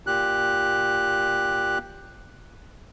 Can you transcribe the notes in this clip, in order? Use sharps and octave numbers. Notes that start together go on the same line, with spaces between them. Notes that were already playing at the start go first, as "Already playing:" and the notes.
A#2 G4 F#6